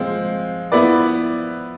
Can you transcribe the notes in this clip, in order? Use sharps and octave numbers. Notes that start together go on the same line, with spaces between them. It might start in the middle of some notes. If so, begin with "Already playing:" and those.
Already playing: F3 G#3 C4 F4
F3 B3 E4 B4 D5